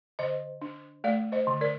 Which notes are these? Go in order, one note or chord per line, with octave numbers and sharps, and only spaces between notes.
D3 C5 D#5
D4
A3 D5 F5
C5 D#5
D3
A#4 D5